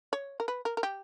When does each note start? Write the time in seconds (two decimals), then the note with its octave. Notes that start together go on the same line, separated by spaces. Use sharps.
0.13 C#5
0.40 A#4
0.48 B4
0.65 A#4
0.77 A#4
0.83 G4